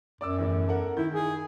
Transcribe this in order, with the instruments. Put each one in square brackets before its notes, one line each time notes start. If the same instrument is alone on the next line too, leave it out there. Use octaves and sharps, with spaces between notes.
[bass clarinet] F#2 [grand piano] D5 D6 E6
[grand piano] E2 A2
A4 A#4 F#5
[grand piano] D#3 G6 [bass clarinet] E4
[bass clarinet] G#4